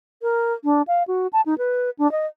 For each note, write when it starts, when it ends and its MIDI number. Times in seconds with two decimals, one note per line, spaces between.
0.22 0.53 70
0.64 0.82 62
0.88 1.03 77
1.08 1.27 66
1.33 1.41 81
1.46 1.57 63
1.58 1.90 71
1.99 2.10 62
2.12 2.26 75